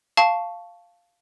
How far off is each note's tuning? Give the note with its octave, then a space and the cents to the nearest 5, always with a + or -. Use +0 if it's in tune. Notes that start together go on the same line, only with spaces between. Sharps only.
F5 +0 A5 +0 C#6 +0